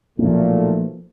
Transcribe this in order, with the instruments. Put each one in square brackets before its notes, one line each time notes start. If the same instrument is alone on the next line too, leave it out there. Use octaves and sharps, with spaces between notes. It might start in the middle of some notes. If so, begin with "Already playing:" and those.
[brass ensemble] B1 A#2 A3 [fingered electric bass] F3 A#3